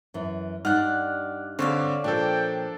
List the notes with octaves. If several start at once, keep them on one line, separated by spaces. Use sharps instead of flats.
F#2 E3
G2 D#4 D5 F#5 F6 F#6
D3 C4 C#5 D5 F5
A#2 F3 D4 A4 G5